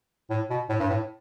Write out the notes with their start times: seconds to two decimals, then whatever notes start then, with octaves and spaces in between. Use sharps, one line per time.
0.30 A2
0.50 B2
0.69 A2
0.80 G2
0.90 A2